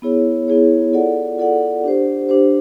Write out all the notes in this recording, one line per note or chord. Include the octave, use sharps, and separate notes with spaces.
B3 E4 G#4 C#5
B3 E4 G#4 C#5
F4 A4 D5 F#5
F4 A4 D5 F#5
D4 G4 C5
D4 G4 C5